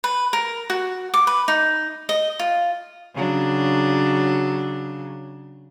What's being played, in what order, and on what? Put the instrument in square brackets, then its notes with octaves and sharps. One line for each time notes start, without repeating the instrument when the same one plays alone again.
[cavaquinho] B4
A#4
F#4
D6
B4
D#4
D#5
F4
[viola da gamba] C#3 F#3 D4